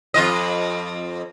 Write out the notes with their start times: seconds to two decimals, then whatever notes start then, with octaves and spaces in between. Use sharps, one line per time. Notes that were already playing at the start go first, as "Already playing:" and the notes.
0.14 F2 F4 D#5